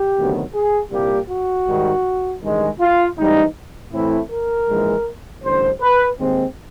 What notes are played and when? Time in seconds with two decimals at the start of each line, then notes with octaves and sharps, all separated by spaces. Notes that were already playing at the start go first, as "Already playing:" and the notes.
Already playing: G4
0.17 D2 C3 D#3 F#3 B3
0.54 G#4
0.92 C2 A#2 G3 A#3 G4
1.29 F#4
1.67 G#2 D#3 G3
2.42 A1 G2 D#3 G#3
2.80 F4
3.18 A1 G#2 E3 G3 D#4
3.92 A2 E3 A3 C4 E4
4.30 A#4
4.68 A#1 G#2 E3 G#3
5.44 A1 G2 D3 C5
5.81 B4
6.19 D#2 D#3 G#3 C4